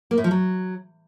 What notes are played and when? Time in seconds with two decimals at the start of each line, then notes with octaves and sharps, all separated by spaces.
0.11 A#3
0.18 A2
0.24 F3
0.31 F#3